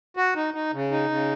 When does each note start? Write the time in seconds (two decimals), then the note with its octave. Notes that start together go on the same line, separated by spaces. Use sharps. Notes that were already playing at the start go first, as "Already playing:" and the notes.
0.17 F#4
0.36 D#4
0.54 D#4
0.73 C#3
0.91 D#4
1.10 C#3